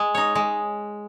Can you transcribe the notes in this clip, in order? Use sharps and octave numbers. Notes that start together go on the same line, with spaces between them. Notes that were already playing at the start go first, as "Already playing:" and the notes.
Already playing: G#3
D#4 C#5
G#3